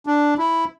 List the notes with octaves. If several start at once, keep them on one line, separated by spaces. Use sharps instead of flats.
D4
E4